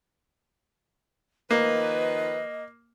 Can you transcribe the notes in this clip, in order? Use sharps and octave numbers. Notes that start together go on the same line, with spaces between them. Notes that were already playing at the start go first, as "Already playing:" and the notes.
D#3 F3 A#3 B4 D#5